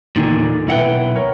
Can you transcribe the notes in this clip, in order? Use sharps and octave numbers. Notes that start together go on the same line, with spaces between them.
E2 A#2 D3 D#3
B1 E4 B4 F#5 G5
A#4 C#5